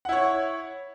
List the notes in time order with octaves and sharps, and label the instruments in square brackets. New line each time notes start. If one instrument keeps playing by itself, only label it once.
[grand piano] F#5
E4
C#5